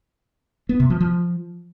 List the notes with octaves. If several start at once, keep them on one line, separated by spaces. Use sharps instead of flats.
B3
C3
F3
F3